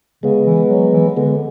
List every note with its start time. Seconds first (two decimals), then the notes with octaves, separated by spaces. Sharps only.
0.23 C#3 G#3 B3
0.46 E3
0.70 F#3
0.93 E3
1.17 D3 G#3 B3